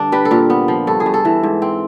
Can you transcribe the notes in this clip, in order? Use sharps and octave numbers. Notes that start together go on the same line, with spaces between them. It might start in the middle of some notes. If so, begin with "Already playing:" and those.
Already playing: G2 D3 D4
G3 B4
A4
A#2 A#4
B3
F3
G2 A4
G#4
G2
A4
E3
G#2
C4